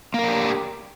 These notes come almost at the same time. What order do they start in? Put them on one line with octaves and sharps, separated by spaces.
A#3 A#4 D4 G4